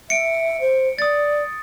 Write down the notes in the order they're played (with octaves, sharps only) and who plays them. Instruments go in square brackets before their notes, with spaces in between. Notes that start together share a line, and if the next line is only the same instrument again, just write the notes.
[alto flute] E5 [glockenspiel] C#7 D7
[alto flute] C5
[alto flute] D5 [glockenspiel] D#6 A6